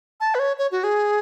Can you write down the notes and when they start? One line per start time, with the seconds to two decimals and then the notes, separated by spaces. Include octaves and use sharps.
0.20 A5
0.35 B4
0.39 C#5
0.58 C#5
0.72 F#4
0.84 G#4